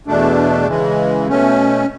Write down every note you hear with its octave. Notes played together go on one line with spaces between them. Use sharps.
E2 B2 A3 D4
C#3 E3 G#3
B2 A3 C#4